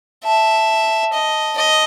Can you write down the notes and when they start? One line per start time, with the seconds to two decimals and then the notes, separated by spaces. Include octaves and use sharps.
0.25 E5 A5
1.13 D#5
1.56 D#5